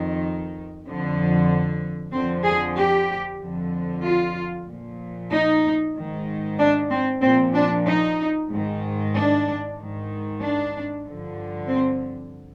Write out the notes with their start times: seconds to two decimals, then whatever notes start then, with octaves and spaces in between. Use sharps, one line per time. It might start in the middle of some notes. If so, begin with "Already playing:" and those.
Already playing: F2 D#3
0.84 F2 D3 F3
2.12 F2 D3 F3 C4
2.44 G#4
2.76 G4
3.40 F2 D3 F3
4.03 F4
4.67 A#2 F3
5.31 D#4
5.95 G#2 D#3
6.58 D4
6.90 C4
7.21 A#2 C4
7.26 F3
7.54 D4
7.85 D#4
8.49 G#2 D#3
9.13 D4
9.77 G#2 D#3
10.41 D4
11.05 G2 D3 F3
11.68 C4